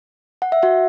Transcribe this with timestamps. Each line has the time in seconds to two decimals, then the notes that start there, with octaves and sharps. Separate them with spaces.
0.42 F#5
0.52 E5
0.63 F#4 F#5